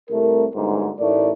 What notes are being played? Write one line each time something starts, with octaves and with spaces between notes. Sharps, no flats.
C2 A3 A#4
G1 D2 G#2
A1 A2 A3 D#4 A#4 D5